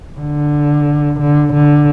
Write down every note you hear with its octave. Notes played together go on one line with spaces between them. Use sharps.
D3
D3
D3